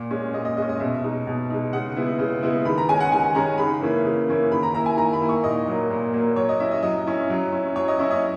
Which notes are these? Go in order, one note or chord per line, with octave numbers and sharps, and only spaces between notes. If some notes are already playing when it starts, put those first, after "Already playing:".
Already playing: A#2
G#3 C#4
A#2 D#5
D#5
G#3 D#5
C#4
D#5
B2 E5
G#3 D#4
B2
G#3 D#4
C#3 F#5
G#3 B3 E4
C#3
G#3 B3 E4
D#3 B5
A#5
G#3 C#4 G#5
F#5
D#3 G#5
G#3 C#4 A#5
C#3 B5
E3 A#3 C#4 E4
C#3
E3 A#3 C#4 E4
D#3 B5
A#5
A#3 E4 A#5
G#5
D#3 A#5
B5
A#3 E4
C#6
A#2 D#5
F#3 A#3
A#2
F#3 A#3
F#3 C#5
D#5
C#4 E4 E5
D#5
F#3 D#5
C#4 E4
F#3
C#4 E4
F#3 C#5
D#5
C#4 E4
D#5